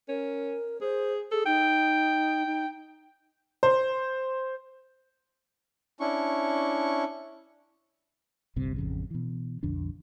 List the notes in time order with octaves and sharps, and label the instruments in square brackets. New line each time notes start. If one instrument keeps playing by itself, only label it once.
[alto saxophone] C#4 [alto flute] A#4
[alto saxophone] G#4 [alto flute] C5
[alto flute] G#4 [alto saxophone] A4
[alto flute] D#4 [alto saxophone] G5
[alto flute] D#4
[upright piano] C5
[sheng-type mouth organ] C#4 D4 E4 C#6
[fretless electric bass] G1 C2 C3
A1 F2 C#3
B2 E3
B1 F2 D3 D4